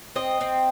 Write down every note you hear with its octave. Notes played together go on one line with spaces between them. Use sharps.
C4 D#5
C4